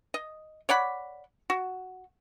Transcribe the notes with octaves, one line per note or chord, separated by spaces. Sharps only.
D#5
C#5 D5 F#5 B5
F#4